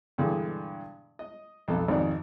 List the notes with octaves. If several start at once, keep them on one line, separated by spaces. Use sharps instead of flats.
G2 B2 D3 E3 G#3
D#5
B1 F2 A4
G#1 F2 C3 D#3 D5